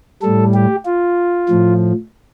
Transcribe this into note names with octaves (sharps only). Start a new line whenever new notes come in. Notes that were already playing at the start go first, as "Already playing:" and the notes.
A2 G3 A4
G4
F4
A2 F3